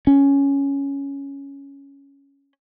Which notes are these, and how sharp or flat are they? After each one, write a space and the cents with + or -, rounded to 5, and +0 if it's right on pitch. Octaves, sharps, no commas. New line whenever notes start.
C#4 +5